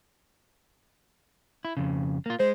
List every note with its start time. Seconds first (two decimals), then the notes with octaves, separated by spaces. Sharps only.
1.65 E4
1.77 F2 C#3
2.26 A#3 F4
2.40 G#3 C5